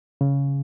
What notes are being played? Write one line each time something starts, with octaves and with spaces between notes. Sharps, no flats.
C#3